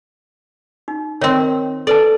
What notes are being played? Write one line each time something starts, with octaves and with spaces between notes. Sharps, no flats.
D#4
D#3 C4 A#4 C#5
A4 B4 D5 A5